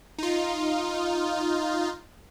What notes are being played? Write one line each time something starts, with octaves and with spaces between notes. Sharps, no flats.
D#4 F4